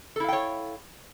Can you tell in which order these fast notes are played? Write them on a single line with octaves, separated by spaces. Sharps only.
A4 E4 F5 G5 C#5